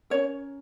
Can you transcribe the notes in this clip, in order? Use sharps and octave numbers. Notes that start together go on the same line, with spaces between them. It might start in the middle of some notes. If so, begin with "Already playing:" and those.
C#4 A#4 C#5